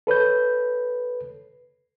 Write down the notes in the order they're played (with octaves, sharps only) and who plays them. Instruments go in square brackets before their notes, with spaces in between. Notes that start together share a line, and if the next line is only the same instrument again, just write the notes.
[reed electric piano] A4 B4 C#5 G6